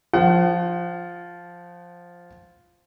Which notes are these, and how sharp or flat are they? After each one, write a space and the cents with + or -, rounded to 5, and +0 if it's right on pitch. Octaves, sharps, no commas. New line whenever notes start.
F3 +0 F#5 +40